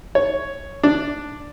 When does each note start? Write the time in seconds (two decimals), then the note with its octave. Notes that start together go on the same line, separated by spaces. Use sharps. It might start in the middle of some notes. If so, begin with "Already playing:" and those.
0.15 C#5
0.83 D4